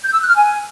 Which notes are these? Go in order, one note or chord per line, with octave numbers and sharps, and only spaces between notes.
G6
E6
F#6
F6
G#5